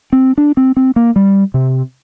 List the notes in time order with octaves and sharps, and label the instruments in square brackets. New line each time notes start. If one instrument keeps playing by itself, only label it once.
[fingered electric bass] C4
D4
C4
C4
A#3
G3
C3